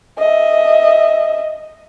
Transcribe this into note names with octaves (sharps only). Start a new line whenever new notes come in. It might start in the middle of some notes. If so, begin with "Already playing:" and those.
D#5 E5